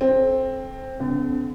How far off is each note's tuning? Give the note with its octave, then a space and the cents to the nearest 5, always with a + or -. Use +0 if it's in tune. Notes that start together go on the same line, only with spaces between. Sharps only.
C4 +10 A4 -30
D3 -40 C4 -45